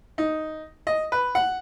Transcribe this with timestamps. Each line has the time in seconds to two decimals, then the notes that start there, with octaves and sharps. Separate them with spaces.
0.18 D#4
0.87 D#5
1.12 B4
1.35 F#5